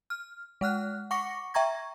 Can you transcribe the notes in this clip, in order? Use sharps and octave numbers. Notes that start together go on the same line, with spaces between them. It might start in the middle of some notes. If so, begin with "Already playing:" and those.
F6
G#3 F#5 F6 F#6
F#5 C#6 D6 A#6 C#7
E5 G5 A#5 C#6 G#6 A#6